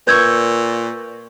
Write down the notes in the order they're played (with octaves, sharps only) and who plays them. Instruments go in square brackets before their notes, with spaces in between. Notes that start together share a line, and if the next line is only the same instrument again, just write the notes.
[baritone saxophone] A#2 [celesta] B4 G#6 [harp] C#6 E6 G6